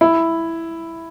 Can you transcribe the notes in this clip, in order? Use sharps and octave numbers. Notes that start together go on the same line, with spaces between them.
E4